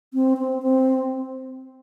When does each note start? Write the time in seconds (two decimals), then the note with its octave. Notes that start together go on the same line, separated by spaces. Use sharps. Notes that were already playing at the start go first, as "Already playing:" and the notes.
0.14 C4
0.38 C4
0.62 C4